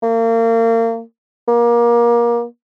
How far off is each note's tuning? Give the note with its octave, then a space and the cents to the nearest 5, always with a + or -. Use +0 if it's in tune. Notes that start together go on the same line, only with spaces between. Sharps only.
A#3 -35
A#3 +25